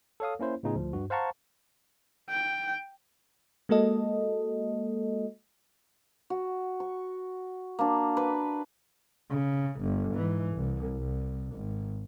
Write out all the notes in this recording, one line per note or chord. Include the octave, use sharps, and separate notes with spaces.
A4 C#5 F5 D#6
A#3 C#4 E4 C5
A2 C#3 B3 D#4 F4 G#4
D2 F3
G2 F#4
C5 F5 F#5 A5 A#5 C#6
G5
G#3 A#3 F#4 A4 D#5
F#4
C#6
A#3 D4
B4
C#3
G1
G#2 E3
C2
C2
G#1